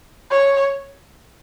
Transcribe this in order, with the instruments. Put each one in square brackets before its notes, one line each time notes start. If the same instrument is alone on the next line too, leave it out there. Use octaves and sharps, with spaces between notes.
[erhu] C#5